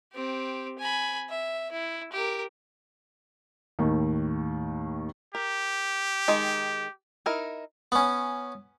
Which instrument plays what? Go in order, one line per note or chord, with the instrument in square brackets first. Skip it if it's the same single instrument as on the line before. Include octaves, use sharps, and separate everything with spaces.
[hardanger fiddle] C4 G4
G#5 B5
E5
E4
G4 A#4
[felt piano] D#2 A2 D#3
[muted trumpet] G4 [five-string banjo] A#4
[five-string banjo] D#3 G#3 D#4
D#4 E4 A#4
[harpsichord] B3 C#4